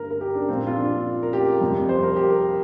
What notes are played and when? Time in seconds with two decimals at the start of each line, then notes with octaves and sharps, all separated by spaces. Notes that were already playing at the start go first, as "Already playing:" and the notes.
Already playing: G2 D3 A#3 A#4
0.11 A#4
0.21 G4
0.35 D4
0.49 A#2 F3 A#3 C4
0.67 F4
0.77 D4
1.23 A#4
1.33 G4
1.61 F2 C3 G3
1.89 C5
2.03 A#4
2.16 G4
2.30 A#4